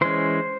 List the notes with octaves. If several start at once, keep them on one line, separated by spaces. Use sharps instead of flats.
E3 G#3 C#4 C5